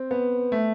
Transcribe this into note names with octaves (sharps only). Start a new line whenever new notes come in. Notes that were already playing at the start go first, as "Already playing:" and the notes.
Already playing: C4
B3
A3